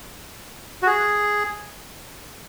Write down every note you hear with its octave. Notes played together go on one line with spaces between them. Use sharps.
F#4
G#4